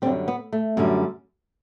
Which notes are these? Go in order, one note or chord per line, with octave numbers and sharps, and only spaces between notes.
F#2 D3 G3 C4
B3
A3
F#2 D3 G3